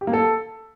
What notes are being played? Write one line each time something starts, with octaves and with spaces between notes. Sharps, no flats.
G4
A#3
A4